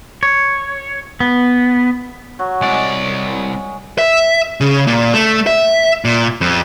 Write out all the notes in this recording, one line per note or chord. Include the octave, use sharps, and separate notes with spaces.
C#5
B3
F#3
C2 G#3 D5
E5
C#3
A#2
A3
E5
A#2
F2